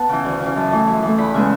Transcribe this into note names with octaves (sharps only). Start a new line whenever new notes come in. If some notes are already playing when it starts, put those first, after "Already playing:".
Already playing: B3 F#5 A5
C#3 E3
D2
C#3 E3
F#2 A5
E3 A3
F#2
E3 A3
E2 B5
C#3 G#3 B3 E5